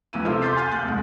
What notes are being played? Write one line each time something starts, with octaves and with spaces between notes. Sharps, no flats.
C#2 E3 E4 D#7
C3 F4 A4
C6 D6 G6 A6 B6 C7
G#5 C6 F6 G6 A6 D#7
D#2 F#6 G6
F1 C2 G#3